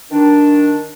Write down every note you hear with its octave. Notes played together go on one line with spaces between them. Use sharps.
D#3 D4